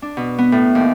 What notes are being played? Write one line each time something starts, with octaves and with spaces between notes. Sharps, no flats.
D4
B2
B3
A2
D#2